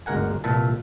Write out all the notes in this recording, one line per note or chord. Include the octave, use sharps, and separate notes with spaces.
G1 D2 G#3 A#4 F#5 G#5
C2 A#2 E3 E4 E5 A5